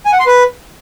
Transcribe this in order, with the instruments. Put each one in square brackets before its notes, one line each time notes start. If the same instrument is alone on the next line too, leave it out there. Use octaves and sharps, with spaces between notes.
[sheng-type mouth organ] G#5
F#5
C6
B4